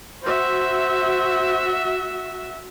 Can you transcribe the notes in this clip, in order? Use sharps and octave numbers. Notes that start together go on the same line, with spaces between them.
F#4 C5 E5